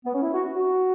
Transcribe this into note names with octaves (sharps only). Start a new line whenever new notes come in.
B3
C#4
E4
F#4
F#4